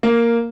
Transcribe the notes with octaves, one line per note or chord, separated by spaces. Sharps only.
A#3